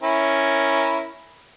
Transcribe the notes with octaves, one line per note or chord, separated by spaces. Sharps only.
C#4 E4 A#4